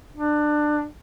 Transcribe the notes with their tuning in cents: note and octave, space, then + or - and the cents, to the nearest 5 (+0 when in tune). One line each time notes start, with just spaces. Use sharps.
D4 +20